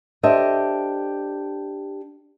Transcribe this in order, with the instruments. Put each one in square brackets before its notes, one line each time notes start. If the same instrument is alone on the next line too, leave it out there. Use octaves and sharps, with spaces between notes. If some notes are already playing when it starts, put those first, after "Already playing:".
[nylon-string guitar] D4 G4 A4 C5 D#5 E5